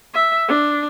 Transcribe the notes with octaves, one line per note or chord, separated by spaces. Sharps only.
E5
D4